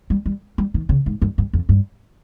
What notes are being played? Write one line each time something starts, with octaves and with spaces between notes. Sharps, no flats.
G3
G3
G3
D#3
C#3
G#2
G2
G2
F2
G2